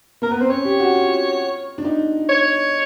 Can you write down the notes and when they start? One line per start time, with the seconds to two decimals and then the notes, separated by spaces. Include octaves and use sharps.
0.22 A#3 A#4
0.31 B3 B4
0.41 C4 C5
0.50 C#4 C#5
0.65 G4
0.80 F#4
0.95 F4
1.78 D4
1.85 D#4
2.29 C#5